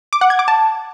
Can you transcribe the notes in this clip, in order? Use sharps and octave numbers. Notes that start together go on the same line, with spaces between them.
D6
F#5
G#6
D6
A5